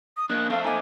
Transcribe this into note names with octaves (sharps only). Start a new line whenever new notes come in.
D#6
A#3 D4 D#5 F#6
A3 C4 A4 F5
A#3 D#4 G#5